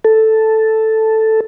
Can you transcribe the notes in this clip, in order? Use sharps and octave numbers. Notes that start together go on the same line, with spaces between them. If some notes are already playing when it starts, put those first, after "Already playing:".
A4